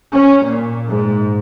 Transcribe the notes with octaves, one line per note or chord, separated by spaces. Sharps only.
C#4
A#2
G#2